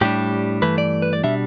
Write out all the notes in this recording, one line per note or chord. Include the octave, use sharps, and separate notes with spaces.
A2 G3 D4 G4
G2 E3 A3 B4
D5
B4
D5
B2 G3 D4 E5